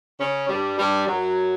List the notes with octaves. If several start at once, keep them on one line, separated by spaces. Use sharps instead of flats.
C#3 C#4
G2 G3
G2 G3
F#2 F#3